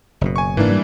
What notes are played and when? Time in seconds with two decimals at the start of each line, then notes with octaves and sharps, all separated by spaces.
0.21 F#1 B2
0.36 G#5 C#6
0.57 G#2 E3 A#3 D4
0.70 G3